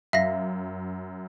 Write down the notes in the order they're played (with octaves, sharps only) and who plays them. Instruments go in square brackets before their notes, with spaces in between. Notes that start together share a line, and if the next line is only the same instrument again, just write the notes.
[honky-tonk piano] F#2 [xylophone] E5 F5 A#6